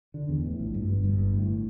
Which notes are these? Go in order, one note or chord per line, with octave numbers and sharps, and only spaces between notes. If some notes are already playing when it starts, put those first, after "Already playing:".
D3
E2
A2
A#1
G2
G1
G2
G1
A2